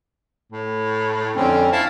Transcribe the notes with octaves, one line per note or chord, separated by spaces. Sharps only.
A2
F2 D3 C4 C#4
E4 F5 A5